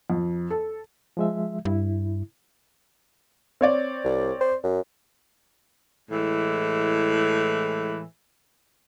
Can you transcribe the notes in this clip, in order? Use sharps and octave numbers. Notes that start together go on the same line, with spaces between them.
F2
A4
F3 G#3 E5
G2 E4
C4 C#5 D5
C2
C5
F#2
A2 E3 G#3